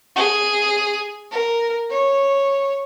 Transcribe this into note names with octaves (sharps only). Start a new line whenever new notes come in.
G#4
A#4
C#5